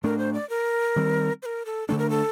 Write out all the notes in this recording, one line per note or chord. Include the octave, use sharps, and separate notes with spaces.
A2 A3 D4 A#4
C5
D5
A#4
D#3 G3 C4
C5
A#4
A4
D3 A3 D4 A4
A#4
A4